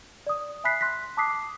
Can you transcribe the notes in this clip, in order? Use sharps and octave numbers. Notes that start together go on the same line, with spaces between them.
D5 D#6
E5 G#5 B5 F#6 B6 C7
C6 F#6 A#6 B6
A5 D6 D#6 F#6 B6 C7